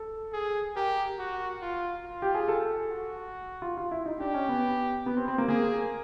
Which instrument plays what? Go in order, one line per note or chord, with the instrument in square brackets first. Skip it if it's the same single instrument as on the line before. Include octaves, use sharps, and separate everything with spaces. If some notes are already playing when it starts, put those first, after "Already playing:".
Already playing: [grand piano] A4
[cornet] G#4
[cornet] G4 [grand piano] A#4
[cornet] F#4
F4
F4
[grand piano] G4
G#4
A4
[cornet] F#4
[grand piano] F4
F4
E4
D#4
[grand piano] D4 [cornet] G4
[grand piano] C#4
B3
B3
C4
C4
A#3
[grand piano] A#3 [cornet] G#4